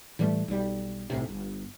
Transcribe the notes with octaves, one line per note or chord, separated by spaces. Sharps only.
A2 E3 G3 A3
B1 G3
B1 A2 C3
G1